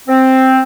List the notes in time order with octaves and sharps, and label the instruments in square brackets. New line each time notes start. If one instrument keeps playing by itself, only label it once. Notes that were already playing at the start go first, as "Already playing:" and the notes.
[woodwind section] C4